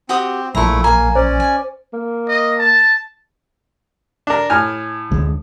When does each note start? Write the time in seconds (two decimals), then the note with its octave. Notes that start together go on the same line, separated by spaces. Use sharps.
0.09 C4 F#4 G4 D#6
0.55 A#1 A#2 A3 E4 A#5 C#6
0.84 A#3 G#5 A#5
1.15 C#4 C5 D5
1.40 G#5
1.93 A#3
2.29 D#5
2.58 A5
4.27 D4 A#4
4.50 A2 G#5 F6
5.11 D2 D3 G#3